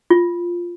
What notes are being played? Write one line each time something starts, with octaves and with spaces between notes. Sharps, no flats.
F4